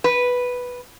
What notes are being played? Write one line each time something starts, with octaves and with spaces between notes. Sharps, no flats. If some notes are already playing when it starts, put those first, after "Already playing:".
B4